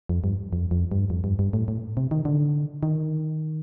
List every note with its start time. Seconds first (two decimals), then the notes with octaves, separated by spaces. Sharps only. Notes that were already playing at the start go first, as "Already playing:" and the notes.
0.09 F2
0.24 G2
0.53 F2
0.71 F2
0.92 G2
1.10 F2
1.24 G2
1.39 G2
1.53 A2
1.68 A2
1.97 C3
2.11 D#3
2.25 D3
2.83 D#3